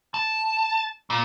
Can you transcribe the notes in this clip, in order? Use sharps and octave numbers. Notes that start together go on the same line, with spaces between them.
A5
A#2